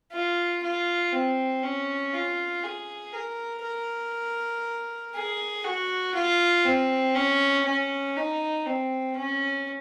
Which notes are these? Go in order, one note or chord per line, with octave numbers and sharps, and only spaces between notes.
F4
F4
C4
C#4
F4
G#4
A#4
A#4
G#4
F#4
F4
C4
C#4
C#4
D#4
C4
C#4